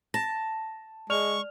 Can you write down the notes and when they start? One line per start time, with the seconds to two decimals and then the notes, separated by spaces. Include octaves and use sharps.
0.14 A5 A#6
1.10 G#3 D5 C#6 F6 F7